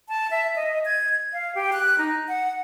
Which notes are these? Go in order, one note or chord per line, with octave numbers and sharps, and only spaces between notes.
A5
E5
D#5
G#6
F5
G4
F#6
D#4
F#5